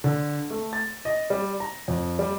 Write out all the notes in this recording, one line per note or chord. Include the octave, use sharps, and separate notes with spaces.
D3
A3
A6
D#5
G3
A#5
F2
G3